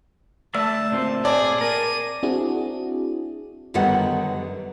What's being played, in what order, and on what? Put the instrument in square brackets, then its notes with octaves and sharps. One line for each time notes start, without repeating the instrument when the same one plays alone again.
[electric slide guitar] A3 D5 E5 [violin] A5 [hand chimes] E6
[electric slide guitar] A#2 C4 C5
[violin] G#4 [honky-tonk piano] D5 [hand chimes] A5
[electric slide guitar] A#4 [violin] D#7
[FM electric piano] C4 D4 E4 F#4 G#4
[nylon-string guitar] F#2 D3 D#3 G3 B3 F#5